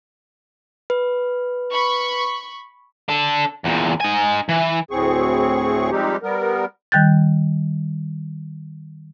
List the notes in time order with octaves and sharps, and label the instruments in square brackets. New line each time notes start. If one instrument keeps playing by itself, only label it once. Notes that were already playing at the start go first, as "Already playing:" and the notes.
[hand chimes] B4
[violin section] B5 C#6
[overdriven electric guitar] D4 A4
E2 A#2
D#4 G#5
E3
[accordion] D2 A2 C4 G#4 C#6
F3 G3 G#3 C4 D#4 G4
G3 B3 A#4
[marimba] D#3 G3 G5 F#6 G6 A6